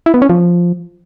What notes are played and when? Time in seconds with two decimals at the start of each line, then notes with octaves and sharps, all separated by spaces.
0.06 E4
0.14 B3
0.22 C#4
0.29 F3